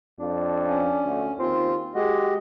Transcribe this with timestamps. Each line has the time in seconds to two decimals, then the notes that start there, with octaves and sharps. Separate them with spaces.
0.19 F2 D4
0.66 C#4
1.05 D2
1.39 D#2 C4 F4
1.95 G#3 F#4 G4 D#5